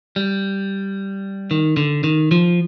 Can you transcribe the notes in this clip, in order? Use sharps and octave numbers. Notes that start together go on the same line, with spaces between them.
G3
D#3
D3
D#3
F3